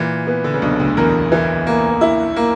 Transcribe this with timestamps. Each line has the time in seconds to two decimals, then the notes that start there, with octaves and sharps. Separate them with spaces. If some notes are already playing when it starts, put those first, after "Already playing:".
Already playing: A#2 E3
0.27 B3
0.44 D3
0.54 C#3
0.62 B1 B2 D4
0.80 D2 D3
0.97 E2 E3 A#4
1.32 E3
1.67 A#3
2.01 E4
2.36 A#3